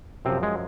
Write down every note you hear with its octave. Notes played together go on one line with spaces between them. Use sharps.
F#2 C3 F3 C4
G#3